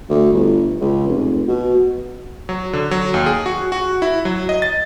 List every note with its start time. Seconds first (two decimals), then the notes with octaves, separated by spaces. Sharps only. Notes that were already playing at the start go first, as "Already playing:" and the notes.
0.10 D2
0.33 G1
0.81 C#2
1.08 F1
1.48 B2
2.49 F#3
2.73 D3
2.91 F#3
3.14 D#2
3.26 G#4
3.46 F#4
3.72 F#4
4.02 E4
4.25 F#3
4.49 D#5
4.62 A6